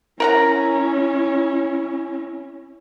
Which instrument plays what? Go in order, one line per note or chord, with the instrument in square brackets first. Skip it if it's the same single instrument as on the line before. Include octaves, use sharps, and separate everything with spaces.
[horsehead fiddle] C#4 E4 [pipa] A#4 F#5 A#5